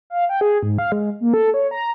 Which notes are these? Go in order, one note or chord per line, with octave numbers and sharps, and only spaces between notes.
F5
G5
G#4
G#2
F5
G#3
A#3
A4
C#5
A#5